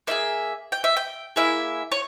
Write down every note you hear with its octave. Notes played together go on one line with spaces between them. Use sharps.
A#3 E4 G#4 E5
G5
E5
G5
A#3 E4 G#4 E5
C#5